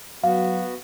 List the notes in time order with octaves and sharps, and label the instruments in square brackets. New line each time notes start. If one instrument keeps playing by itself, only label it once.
[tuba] F#3 [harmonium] B3 F#4 [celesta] F5